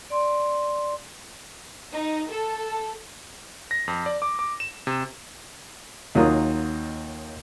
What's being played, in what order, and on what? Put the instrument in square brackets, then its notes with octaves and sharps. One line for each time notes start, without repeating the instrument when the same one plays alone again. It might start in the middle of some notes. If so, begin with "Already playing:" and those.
[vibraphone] D5 C6
[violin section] D#4
A4
[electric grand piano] A#6
F2
D5
D6
D6
E7
C3
[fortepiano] D#2 F#3 A#3 D#4 F4 D#6